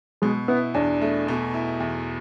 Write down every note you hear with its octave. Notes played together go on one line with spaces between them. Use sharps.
B2 G#3
B3 E4
E2 D4
A3
B2
E4
E2